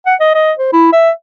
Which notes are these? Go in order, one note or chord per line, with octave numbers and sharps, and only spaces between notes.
F#5
D#5
D#5
C5
E4
E5